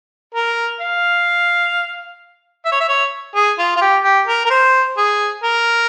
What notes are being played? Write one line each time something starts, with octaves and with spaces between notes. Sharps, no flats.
A#4
F5
E5
C#5
E5
C#5
G#4
F4
F4
G4
G4
A#4
A#4
C5
G#4
A#4